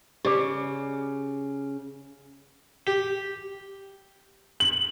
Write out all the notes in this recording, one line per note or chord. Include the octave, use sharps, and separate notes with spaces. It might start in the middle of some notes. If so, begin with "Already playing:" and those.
C#3 G4 D5 D6
G4
F#7